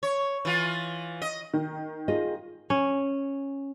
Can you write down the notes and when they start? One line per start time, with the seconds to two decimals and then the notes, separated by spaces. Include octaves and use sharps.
0.03 C#5
0.45 E3 F4
1.22 D#5
1.54 D#3
2.08 F4 G#4 D#5
2.70 C#4